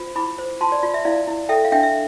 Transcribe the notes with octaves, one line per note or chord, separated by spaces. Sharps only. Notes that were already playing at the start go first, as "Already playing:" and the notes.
Already playing: F4 C5
E4 B5 D6
C5
F4 A5 C6
D5
F4 D5
E5
E4 D5 F5
E4
A4 E5 G5
F5
D4 E5 G5
E5